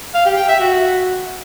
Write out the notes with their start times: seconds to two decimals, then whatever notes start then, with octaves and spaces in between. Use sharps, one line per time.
0.14 F5
0.26 G4
0.37 G5
0.48 E5
0.60 F#4